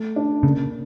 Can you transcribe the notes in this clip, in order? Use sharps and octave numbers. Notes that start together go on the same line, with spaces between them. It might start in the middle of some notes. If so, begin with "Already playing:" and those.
Already playing: A3
D4
C#3 A#3